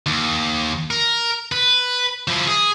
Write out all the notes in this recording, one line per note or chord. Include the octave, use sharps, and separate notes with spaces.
D#2
A#4
B4
F3 E4
G#4